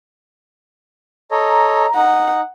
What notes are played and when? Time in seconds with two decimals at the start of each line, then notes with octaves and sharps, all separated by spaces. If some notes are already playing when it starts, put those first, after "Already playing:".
1.31 A4 C#5 D#5 A#5
1.95 D#4 F#5